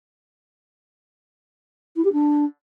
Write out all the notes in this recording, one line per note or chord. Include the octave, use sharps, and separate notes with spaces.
E4
G4
D4